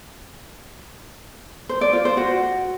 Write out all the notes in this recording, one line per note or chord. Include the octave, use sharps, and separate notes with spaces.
C5
D5
F4
C5
F#4